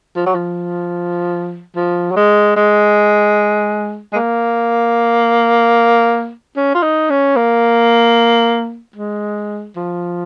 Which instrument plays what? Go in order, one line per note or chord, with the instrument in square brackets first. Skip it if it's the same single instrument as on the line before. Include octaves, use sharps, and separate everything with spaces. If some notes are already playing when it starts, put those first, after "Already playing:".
[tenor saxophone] F3
F#3
F3
F3
F#3
G#3
G#3
G#3
A#3
C#4
F4
D#4
C#4
A#3
G#3
F3